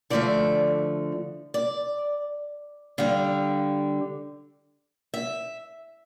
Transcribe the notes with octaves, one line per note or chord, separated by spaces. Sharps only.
D3 F3 A3 D5
D5
D3 G3 F5
E5